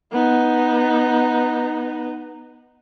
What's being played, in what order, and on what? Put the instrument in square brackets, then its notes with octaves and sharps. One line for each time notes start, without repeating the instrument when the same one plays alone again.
[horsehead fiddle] B3 D#4